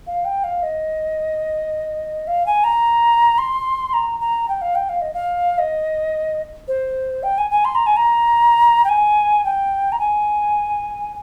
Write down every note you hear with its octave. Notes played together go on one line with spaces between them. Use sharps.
F5
G5
F5
D#5
F5
G#5
A#5
C6
A#5
A#5
G5
F5
G5
F5
D#5
F5
D#5
C5
G5
G#5
G#5
C6
A#5
G#5
A#5
G5
G#5
G5
A#5
G#5